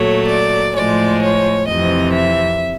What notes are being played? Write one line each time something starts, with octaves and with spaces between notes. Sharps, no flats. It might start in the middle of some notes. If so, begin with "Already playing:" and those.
Already playing: A#2 F#3 A3 C#5
D5
A2 F3 G#3 D5
C#5
F2 C3 E3 D#5
E5